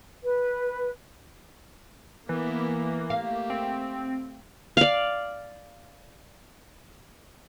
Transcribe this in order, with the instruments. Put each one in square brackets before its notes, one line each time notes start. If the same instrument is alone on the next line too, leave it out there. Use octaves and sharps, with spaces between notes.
[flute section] B4
[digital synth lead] E3 [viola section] A#3 [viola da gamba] B3 E4
[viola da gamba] A3 G4 [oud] F5
[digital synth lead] C4
[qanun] D5 F5